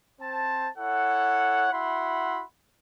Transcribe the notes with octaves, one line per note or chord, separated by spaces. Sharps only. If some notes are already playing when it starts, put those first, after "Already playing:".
C4 C5 A5
E4 A4 C#5 F#5
E4 F#4 E5 F#5 B5 C6